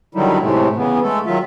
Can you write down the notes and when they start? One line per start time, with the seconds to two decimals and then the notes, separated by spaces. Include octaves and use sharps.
0.15 D3 D#3 F#3 G3 D#4 E4
0.41 A2 C3 G#3 A3
0.76 C#3 E3 B3
1.03 G#3 A3 A4
1.26 D#3 F#3 F4 E5